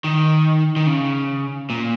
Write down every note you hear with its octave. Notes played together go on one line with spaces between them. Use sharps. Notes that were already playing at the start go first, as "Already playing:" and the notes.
D#3
D#3
C#3
A#2